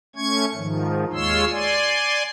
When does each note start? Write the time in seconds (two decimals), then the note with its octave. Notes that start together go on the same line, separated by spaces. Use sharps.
0.16 A3 C#4 C#6 G#6
0.54 G#2 D#3 F3
1.13 D#2 G#3 F4 C#5 C6 E6
1.51 D5 G#5 C6